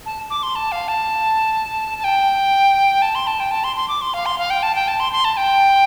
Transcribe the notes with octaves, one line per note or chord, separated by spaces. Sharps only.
A5
D6
C6
A5
F5
A5
A5
G5
A5
C6
A5
G5
A5
C6
C6
D6
C6
F5
C6
F5
G5
A5
G5
A5
C6
C6
A5
G5